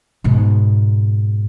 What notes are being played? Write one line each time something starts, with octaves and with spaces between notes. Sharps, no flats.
G#2 B2